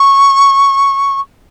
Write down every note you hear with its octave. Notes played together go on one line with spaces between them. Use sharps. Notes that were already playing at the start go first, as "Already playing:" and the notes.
Already playing: C#6